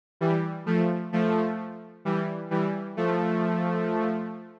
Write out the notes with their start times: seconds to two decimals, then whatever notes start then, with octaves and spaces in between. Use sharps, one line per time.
0.21 E3 G3
0.66 F3 A3
1.13 F3 A3
2.05 E3 G3
2.51 E3 G3
2.97 F3 A3